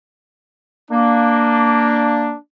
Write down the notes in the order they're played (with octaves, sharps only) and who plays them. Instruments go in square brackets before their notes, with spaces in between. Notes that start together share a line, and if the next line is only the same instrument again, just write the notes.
[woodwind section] A#3 [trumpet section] D4